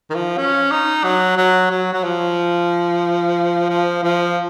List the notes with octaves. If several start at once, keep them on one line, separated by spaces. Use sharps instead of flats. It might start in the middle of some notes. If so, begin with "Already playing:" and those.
D#3
F3
C#4
D#4
F#3
F#3
F#3
F#3
F3
F3
F3